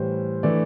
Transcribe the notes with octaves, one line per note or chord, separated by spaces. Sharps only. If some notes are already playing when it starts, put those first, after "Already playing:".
Already playing: A2 E3 G3 C5
E3 A3 D4 D5